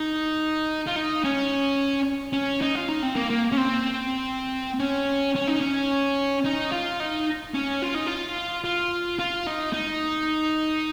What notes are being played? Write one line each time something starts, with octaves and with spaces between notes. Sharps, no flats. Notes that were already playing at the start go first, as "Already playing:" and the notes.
Already playing: D#4
F4
D#4
C#4
C#4
D#4
F4
D#4
C4
A#3
A#3
C#4
C4
C#4
C#4
D#4
C#4
D#4
F4
D#4
C#4
F4
D#4
F4
F4
F4
D#4
D#4